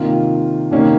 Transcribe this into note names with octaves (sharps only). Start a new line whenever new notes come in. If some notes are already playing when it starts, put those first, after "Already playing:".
Already playing: C3 D#3 A#3 F4
C3 D#3 A#3 C#4